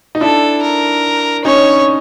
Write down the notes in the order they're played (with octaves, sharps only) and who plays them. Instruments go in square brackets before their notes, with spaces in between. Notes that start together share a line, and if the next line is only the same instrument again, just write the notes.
[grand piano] D#4
[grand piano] D4 E4 [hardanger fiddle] A4
[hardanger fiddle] A#4
[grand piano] C#4 D#4 [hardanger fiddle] C#5